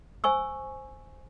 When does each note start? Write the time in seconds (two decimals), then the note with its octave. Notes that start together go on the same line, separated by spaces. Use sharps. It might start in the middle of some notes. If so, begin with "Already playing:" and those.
0.24 C5 G#5 C#6 E6